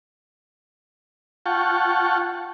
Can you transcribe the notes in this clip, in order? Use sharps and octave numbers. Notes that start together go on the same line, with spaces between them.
F4 F#5 G5 A5 C#6